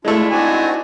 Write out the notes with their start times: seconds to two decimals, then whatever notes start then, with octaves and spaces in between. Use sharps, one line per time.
0.05 G#3 A3 D4 E4 F4
0.31 C4 D4 D#4 F#4 G#5